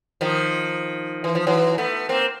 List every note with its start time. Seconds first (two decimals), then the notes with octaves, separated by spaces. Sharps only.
0.21 D#3 F3
1.24 E3
1.35 F3
1.47 E3 F#3
1.78 A3 B3
2.09 A#3 C4